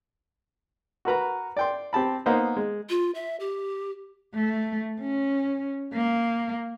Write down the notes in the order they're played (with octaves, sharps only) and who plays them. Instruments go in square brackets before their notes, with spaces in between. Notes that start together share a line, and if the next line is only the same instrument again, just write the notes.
[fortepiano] F#4 A#4 B4 A#5
D5 G5 C6
C4 G4 A5 B5
A#3 B3 D#4 C5
G#3
[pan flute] F4
E5
G4
[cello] A3
C#4
A#3